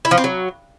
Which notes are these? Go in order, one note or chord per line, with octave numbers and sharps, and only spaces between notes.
E4
F3
C4
F#3